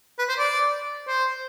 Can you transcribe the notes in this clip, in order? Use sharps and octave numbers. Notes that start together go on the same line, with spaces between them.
B4
C5
D5
C5